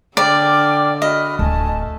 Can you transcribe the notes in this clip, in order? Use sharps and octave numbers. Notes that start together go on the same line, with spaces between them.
D3 D5 G5 D6 F6
F#4 D#5 B5 F6
D1 A3 G#5 A5